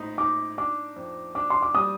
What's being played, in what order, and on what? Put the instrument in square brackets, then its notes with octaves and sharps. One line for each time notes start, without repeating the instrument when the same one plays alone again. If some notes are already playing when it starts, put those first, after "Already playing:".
Already playing: [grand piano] A#1 A2 D#4
[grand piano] D#4 [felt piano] D6
[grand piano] D4 [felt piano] D6
[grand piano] F2
[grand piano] D4 [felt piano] D6
[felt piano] C6
D6
[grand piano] G3 [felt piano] D#6